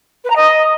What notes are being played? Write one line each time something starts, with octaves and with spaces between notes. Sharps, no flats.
B4
A#5
D#5